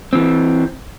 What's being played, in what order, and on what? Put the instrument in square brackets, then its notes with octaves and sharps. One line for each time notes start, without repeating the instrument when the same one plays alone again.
[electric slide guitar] E3 C4